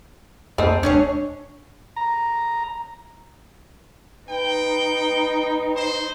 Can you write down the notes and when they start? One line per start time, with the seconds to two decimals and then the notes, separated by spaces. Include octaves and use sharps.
0.58 F2 A3 C4 D#4
0.83 D1 G#3 C#4 D4 G#4 C#5
1.96 A#5
4.29 D#4 B4 G5
5.76 C5